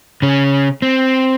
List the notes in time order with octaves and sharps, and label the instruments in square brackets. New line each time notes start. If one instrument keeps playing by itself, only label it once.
[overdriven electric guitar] C#3 C#4
C4